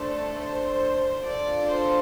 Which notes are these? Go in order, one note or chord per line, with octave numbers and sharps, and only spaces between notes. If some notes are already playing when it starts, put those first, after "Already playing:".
Already playing: A3 D4 A4 C5
C5
D4 F4 A4 D5
C5